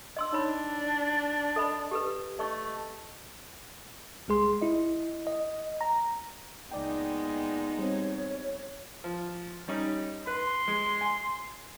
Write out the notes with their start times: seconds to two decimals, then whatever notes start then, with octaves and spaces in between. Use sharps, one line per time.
0.17 D#5 C6 E6
0.33 D4 D#4 C#5 B5
1.56 A4 D#5 B5
1.91 G4 A4 B4
2.39 A3 D#5 C#6
4.28 C2 G#3 G#4 C6
4.62 E4 D#5
5.27 D#5
5.81 A#5
6.71 C#2 A#2 G#3 B3 D#4 D5 G5
7.79 G3 C4 C#5
9.04 F3
9.68 G3 C#4 D#4
10.27 B4 C6
10.68 G#3
11.01 G#5